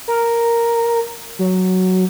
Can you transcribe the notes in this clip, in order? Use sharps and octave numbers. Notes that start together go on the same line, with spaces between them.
A#4
F#3